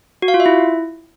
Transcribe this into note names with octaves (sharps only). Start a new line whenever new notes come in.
F#4
F5
F4
E5
E4